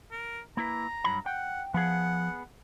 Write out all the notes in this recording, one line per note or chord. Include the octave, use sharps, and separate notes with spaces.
A#4
A#3 E4 B4 A#5
G2 F#3 B5
F#5 G5
F3 B3 G#4 F#5